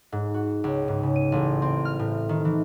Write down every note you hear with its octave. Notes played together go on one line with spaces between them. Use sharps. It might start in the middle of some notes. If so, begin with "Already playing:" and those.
G#2
F#4
C#2
G#2
C#3
D#7
A1
C4
F6
A2
D#3
E3